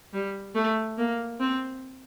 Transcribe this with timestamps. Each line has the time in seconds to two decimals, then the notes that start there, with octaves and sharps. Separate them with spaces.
0.13 G3
0.55 A3
0.98 A#3
1.40 C4